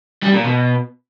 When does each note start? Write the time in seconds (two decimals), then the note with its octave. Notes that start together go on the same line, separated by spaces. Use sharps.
0.23 G3
0.34 A#2
0.45 B2